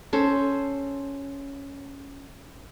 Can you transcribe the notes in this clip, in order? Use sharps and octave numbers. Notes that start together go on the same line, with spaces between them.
C#4 A4 C5